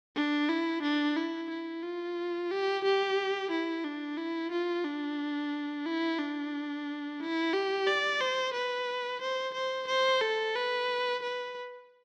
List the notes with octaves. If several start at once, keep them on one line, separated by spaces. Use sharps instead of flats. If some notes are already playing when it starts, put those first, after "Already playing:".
D4
E4
D4
E4
E4
F4
G4
G4
E4
D4
E4
F4
D4
E4
D4
E4
G4
D5
C5
B4
C5
C5
C5
A4
B4
B4